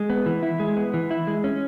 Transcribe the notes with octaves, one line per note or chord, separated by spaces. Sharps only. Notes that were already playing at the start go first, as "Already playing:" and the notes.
Already playing: G#3
B3
E3
E4
G#3
B3
E3
E4
G#3
C#4